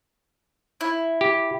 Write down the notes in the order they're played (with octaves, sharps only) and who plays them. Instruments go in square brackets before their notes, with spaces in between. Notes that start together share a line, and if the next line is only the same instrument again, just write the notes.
[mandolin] E4
[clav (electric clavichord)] G4